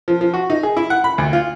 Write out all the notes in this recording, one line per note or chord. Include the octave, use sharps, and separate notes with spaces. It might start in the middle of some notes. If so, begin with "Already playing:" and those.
F3
F3
F#4
D#4
G#4
E4
F#5
B5
D2
F4